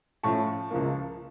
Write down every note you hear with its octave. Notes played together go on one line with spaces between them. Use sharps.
A2 F3 C#4 A5 C#6
C#2 C#3 F3 A#3